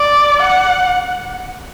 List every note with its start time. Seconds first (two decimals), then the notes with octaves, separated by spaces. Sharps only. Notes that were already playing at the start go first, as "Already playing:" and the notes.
Already playing: D5
0.42 F#5